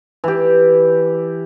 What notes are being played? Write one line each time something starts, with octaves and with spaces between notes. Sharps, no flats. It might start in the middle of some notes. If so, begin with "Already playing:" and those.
E3 G4